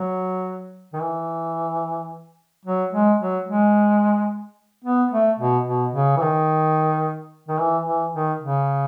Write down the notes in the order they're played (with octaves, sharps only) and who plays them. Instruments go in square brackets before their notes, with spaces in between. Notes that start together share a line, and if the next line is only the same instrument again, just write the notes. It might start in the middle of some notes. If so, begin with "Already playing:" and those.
Already playing: [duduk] F#3
D#3
E3
F#3
G#3
F#3
G#3
B3
A3
B2
B2
C#3
E3
D#3
D#3
E3
E3
D#3
C#3